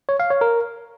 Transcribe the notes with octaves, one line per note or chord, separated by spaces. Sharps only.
C#5
F5
C#5
A#4